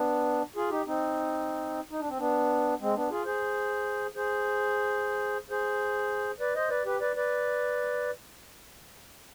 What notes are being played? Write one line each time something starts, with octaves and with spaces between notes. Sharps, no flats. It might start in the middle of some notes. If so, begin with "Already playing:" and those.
Already playing: B3 D4
F4 G#4
D#4 G4
C4 D#4
D#4
D4
C4
B3 D4
G#3 C4
B3 D4
F4 G#4
G#4 C5
G#4 C5
G#4 C5
B4 D5
C5 D#5
B4 D5
G4 B4
B4 D5
B4 D5